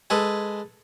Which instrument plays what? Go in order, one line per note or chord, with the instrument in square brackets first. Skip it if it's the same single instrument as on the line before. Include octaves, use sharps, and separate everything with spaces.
[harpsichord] G#3 A4 B4 G#5